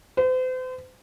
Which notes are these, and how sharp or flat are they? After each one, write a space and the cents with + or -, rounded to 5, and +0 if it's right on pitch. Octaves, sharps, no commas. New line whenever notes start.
C5 -40